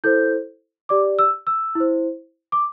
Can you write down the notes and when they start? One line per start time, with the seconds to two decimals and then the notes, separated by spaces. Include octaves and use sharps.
0.04 E4 A4 C5 G6
0.89 G4 D5 D6
1.19 E6
1.47 E6
1.75 E4 C5
2.52 D6